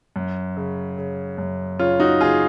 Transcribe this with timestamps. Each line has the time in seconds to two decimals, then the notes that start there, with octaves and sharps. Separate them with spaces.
0.16 F#2
0.57 C#3
0.98 C#3
1.38 F#2
1.79 C#3 C#4 F4
2.00 D#4 F#4
2.20 C#3 F4 G#4